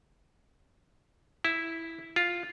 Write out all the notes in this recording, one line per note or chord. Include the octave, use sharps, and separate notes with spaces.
E4
F4